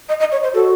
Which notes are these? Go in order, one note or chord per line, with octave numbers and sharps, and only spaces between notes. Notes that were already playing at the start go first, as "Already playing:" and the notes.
D#5
D#5
C#5
C5
F#4 A4